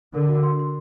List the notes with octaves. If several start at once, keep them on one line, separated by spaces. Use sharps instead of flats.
D3 A#4
F#4
C6
C6